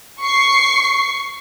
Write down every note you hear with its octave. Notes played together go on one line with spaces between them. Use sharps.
C#6 C7